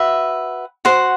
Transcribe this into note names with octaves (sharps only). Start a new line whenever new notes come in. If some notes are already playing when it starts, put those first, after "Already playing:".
Already playing: F#4 B4 E5
F#4 C5 F#5